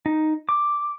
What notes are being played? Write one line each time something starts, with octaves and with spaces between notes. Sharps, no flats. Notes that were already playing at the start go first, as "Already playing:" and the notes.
D#4
D6